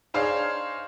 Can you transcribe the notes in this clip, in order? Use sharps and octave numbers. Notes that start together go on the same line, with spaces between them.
D4 D#4 G#4 C5 C#5 F5